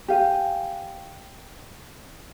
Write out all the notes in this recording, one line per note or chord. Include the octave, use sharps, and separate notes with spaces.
G4 F5 G#5